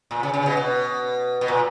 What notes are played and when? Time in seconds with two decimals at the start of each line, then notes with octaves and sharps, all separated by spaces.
0.11 A#2
0.23 C#3
0.34 C#3
0.46 B2
0.57 B2
1.41 B2
1.48 A#2